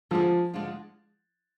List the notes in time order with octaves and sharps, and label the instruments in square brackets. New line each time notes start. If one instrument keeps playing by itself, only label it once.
[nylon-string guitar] D3 G#3 D4 G#4 D5 [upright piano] F3
[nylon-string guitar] D3 F3 G#3 D4 F4